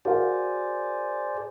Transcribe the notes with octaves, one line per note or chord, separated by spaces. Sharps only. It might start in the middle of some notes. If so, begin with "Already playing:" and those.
F#4 G#4 A#4 C5 D5 F5